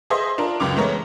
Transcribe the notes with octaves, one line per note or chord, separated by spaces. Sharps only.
G#4 C5 D#5 E5 C6
D4 F4 A#4
C#2 F#2 C#3 D6 F7
E3 G#3 A3 B3 A#4 C#5